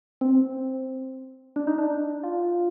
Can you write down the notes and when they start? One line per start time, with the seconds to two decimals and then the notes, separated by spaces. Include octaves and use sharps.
0.21 C4
1.56 D4
1.67 D#4
1.78 D4
2.23 F4